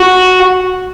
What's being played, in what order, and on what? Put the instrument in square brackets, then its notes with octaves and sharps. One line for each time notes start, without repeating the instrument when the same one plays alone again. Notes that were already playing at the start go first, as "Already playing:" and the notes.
Already playing: [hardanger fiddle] F#4